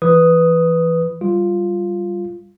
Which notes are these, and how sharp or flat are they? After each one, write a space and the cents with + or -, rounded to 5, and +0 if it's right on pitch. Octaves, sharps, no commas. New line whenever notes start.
E3 +20 B4 +0 D#6 +0
G3 +0 F4 +0